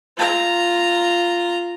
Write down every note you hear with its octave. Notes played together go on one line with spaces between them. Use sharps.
F4 A#5